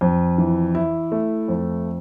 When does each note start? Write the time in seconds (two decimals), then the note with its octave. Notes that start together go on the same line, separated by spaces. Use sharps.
0.01 F2
0.38 E3
0.75 E4
1.12 A3
1.48 F2